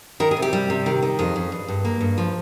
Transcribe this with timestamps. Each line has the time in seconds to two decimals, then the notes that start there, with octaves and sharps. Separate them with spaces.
0.20 D#3 A#4
0.31 G#4
0.37 C3
0.42 G4
0.53 G3
0.70 C3
0.86 D#3
1.02 D#3
1.19 F2 G#4
1.36 F2
1.52 G2
1.68 G2
1.85 A#3
2.01 G2
2.18 F3